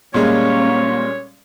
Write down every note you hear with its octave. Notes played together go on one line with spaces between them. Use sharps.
A#2 G3 G#3 A#3 C#4 C#5